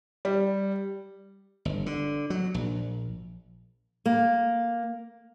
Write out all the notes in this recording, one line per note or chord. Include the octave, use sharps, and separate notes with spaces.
G3
G1
D3
F#3
A#1
A#3